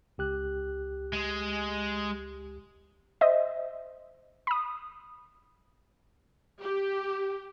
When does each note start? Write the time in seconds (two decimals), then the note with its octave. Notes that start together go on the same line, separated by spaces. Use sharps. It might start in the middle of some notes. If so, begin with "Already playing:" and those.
0.18 C#2 G4 F#6
1.13 G#3
3.21 C5 D#5 E5
4.47 B5 D#6
6.63 G4